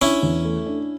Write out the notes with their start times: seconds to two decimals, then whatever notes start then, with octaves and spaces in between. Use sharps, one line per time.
0.01 C#4 D4 E4
0.23 E2
0.45 A3
0.66 D4